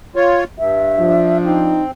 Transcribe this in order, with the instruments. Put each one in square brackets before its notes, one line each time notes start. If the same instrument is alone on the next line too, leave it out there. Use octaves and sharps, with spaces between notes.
[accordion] F4 C#5
[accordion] G2 [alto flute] E5
[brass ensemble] F3 D4
[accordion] C4 [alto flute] D#4